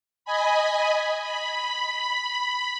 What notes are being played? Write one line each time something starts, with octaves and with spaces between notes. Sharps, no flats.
D#5 G#5 B5
B5